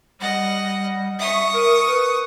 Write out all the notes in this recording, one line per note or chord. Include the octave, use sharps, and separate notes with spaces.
G3 D#5 F#5
E5 C#6 D#6
A#4
B4